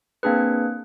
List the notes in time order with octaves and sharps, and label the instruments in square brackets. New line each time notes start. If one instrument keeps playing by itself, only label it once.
[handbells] A#3 C4 D4 G#4 B4